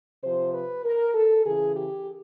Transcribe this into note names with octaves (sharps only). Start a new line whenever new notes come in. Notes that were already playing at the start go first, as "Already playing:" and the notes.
C3 F3 C5
B4
A#4
A4
C#3 E3 G#4
G4